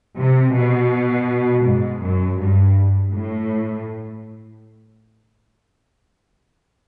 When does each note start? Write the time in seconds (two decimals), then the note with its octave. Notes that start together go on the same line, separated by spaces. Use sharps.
0.17 C3
0.54 B2
1.65 G#2
2.01 F#2
2.39 G2
3.12 A2